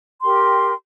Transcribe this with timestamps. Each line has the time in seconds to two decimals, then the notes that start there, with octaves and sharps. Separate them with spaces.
0.21 G4 A#4 G5 C6